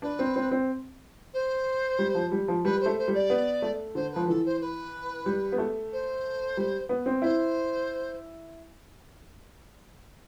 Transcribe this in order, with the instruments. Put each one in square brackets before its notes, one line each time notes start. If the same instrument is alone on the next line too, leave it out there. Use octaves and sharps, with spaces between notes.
[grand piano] D4 [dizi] B4
[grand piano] C4
C4
C4
[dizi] C5
[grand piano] G3
F3
G3
F3
[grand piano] G3 [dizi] B4
[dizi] C5
[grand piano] A3
[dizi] C5
[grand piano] G3
[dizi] D5
[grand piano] B3
A3
[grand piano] D3 [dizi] C5
[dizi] B4
[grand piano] F3
[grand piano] E3 [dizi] A4
[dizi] C5
B4
[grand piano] G3
B3
A3
[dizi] C5
[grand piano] G3
B3
C4
[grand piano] E4 [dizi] C5